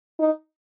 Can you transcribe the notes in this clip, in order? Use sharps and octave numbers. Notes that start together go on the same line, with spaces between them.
D#4